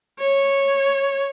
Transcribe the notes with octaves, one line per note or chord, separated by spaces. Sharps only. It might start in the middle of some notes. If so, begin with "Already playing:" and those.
C#5